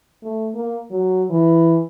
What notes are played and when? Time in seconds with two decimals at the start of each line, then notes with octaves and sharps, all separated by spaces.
0.23 A3
0.55 A#3
0.91 F#3
1.30 E3